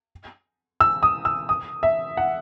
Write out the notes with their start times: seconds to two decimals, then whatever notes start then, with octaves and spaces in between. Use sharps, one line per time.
0.81 E6
1.03 D#6
1.25 E6
1.49 D#6
1.83 E5
2.17 F#5